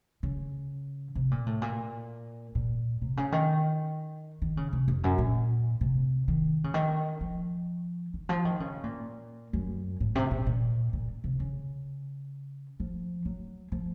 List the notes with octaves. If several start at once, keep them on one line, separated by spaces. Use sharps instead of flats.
C#3
C3
A#2
A2
A#2
A#2
C3
C#3
D#3
D#3
C#3
C3
F2
F#2
A#2
C3
D#3
C#3
D#3
F3
D#3
F3
D#3
C#3
A#2
F#2
A2
C3
A#2
A#2
A#2
C3
C#3
F3
F#3
F3